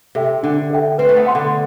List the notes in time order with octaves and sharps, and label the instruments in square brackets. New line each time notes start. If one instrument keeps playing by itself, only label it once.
[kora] C3 [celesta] A4 E5 G5
[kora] D3 [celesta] D4
[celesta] A4 E5 G5
[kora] C4 [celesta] B4
[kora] A3
B3
[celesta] F#5 C6
[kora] D3